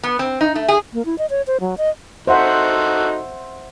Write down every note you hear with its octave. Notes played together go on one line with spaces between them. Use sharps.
B3
C4
D#4
A3
G#4
A#3
E4
D#5
C#5
C5
F#3
D#5
D#4 F#4 A4 C5 E5 F#5